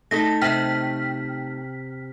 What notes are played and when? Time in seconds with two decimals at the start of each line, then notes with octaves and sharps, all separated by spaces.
0.11 A3 D#4 A4 A#6
0.41 C3 G5 F6 B6